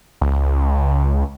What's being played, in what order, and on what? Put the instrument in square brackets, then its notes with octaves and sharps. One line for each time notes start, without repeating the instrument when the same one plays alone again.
[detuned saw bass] C#2